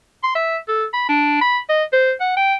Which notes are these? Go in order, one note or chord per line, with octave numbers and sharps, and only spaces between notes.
C6
E5
A4
B5
D4
B5
D#5
C5
F#5
G5